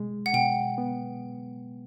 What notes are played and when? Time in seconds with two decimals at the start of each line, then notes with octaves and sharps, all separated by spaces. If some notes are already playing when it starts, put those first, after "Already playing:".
Already playing: B2 G#3
0.26 F#5
0.34 B2 G5
0.78 B3